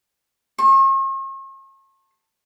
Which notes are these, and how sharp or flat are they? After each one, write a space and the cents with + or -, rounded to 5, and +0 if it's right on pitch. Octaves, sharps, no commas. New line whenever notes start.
A5 +20 C#6 -45